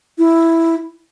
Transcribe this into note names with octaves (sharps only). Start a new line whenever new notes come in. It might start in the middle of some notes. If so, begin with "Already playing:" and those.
E4